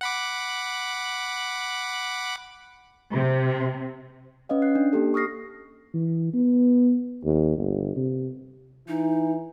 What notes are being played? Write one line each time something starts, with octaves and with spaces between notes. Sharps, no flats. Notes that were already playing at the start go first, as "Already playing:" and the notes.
F#5 B5 D6
C3
C#4 B4 D#5 F5
F#6 C7
D4
A#3 G4 A4
C#6 D#6 F6 A#6 C7
E3
B3
D#2
G1
C3
E3 D#4